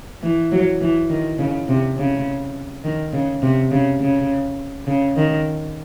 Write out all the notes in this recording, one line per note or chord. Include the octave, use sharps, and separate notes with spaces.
E3
F#3
E3
D#3
C#3
C3
C#3
D#3
C#3
C3
C#3
C#3
C#3
D#3